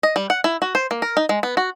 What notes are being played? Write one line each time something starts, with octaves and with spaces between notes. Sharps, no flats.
D#5
G3
F#5
E4
F#4
C5
A#3
A#4
D#4
G#3
B3
F#4